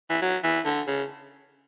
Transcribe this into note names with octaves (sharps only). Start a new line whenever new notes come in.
E3
F#3
E3
D3
C#3